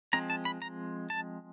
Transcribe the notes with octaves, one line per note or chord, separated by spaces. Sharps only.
F3 G#3 C4 A#5
A5
B5
A#5
A5